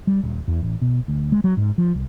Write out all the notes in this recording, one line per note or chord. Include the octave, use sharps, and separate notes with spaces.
G3
D#1
E2
A1
B2
D2
G#3
F#3
G#2
F3
C2